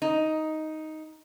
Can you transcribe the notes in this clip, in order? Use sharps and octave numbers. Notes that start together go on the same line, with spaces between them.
D#4